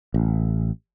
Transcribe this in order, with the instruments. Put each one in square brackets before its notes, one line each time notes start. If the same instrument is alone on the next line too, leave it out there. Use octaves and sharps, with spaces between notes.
[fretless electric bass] A1